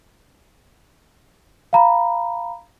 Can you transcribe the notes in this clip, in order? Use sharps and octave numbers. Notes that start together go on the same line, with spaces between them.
F5 A#5 B5